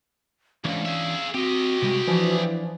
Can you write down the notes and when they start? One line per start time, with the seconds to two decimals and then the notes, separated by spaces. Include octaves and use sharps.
0.65 C2 G#2 E3 C#4 D4 F5
0.86 G#4 E5
1.34 C4 F#4 G4 D#5
1.82 C3 G3 G#3
2.07 E3 F3 D4 E4